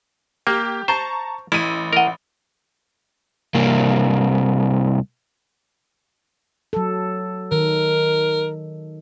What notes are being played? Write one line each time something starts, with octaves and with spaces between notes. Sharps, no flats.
A#3 G4
C5 A5 A#5 C#6
A1 E4 D#7
E4 A#4 D#5 F#5
C2 A#3
F#3 A4
D#3 A#4